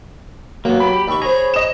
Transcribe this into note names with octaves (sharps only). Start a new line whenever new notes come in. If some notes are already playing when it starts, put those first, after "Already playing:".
F#3 A#3 B3
G4 B5
D#2 C#6
G#4 C5 C#5 A#5
D#5 E7